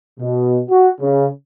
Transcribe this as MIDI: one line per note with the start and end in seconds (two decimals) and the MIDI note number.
0.20 0.60 47
0.71 0.89 66
1.01 1.27 49